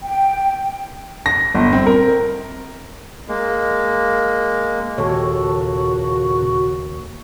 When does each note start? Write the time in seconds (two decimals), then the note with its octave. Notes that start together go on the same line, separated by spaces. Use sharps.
0.03 G5
1.26 A#6
1.54 G1
1.73 C4
1.86 A#4
3.28 G#3 A#3
4.98 D#2 A#2 C#3 F#4 A4 C#5